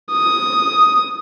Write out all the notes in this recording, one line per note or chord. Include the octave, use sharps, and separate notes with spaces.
D#6